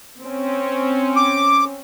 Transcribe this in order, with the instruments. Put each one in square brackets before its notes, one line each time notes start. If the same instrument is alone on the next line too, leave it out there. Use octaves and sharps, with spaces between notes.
[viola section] C4 C#4
[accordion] D6